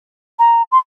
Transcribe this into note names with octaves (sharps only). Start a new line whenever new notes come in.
A#5
C6